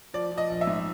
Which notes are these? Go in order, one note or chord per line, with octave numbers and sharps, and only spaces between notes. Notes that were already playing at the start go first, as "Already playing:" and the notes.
F3 D5
F3
D#5
A#1
E5
G#2